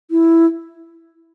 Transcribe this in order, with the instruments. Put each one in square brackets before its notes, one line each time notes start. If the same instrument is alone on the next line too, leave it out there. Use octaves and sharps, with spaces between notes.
[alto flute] E4